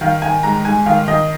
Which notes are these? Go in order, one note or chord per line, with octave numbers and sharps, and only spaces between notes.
D#3 F5
D#3 G#5
G#2 A#5
G#2 G#5
D#3 F5
D#3 D#5